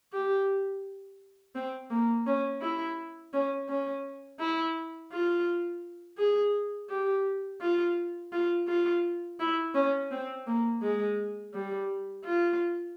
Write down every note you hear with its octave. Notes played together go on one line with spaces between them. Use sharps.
G4
C4
A#3
C#4
E4
C#4
C#4
E4
F4
G#4
G4
F4
F4
F4
E4
C#4
C4
A#3
G#3
G3
F4